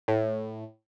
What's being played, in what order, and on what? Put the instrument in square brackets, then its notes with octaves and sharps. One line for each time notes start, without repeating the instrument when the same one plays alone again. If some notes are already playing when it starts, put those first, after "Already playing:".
[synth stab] A2